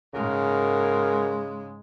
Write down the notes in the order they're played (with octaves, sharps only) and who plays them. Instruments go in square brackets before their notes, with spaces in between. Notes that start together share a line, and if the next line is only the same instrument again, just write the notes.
[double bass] G#2 G#3 [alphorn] C#3 [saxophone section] A#3 F#4 A#4